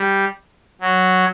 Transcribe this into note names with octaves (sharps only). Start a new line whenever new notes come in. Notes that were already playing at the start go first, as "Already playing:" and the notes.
Already playing: G3
F#3